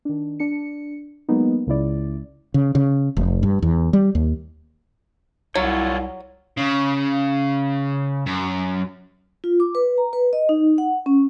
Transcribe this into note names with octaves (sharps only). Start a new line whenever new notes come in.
D#3 D4
D4 C#7
F#3 G#3 A#3 B3 D#4
C#2 C#3 G#3 E4 D5
C#3
C#3
F1
G2
E2
G3
D#2
C2 F#3 E4 F4 C#5
C#3
F#2
F4
D6
B4
A#5
B4
D#5
D#4
F#5
C#4